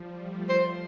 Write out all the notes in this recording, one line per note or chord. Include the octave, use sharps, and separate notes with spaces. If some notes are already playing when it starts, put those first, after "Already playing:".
Already playing: F3 G3
A3
F3 C5